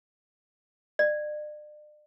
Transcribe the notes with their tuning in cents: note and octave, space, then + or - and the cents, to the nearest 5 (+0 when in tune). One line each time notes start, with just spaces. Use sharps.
D5 +40